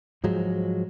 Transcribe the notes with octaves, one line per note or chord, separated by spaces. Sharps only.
G#2 F3 F#3 G#3